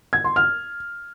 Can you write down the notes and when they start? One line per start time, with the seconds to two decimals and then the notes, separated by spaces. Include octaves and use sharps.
0.13 G#6
0.24 C6
0.36 F6